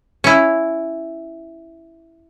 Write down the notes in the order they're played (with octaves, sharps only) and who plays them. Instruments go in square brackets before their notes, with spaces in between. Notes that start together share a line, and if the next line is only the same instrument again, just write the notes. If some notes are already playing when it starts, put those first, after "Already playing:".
[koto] C#4 E4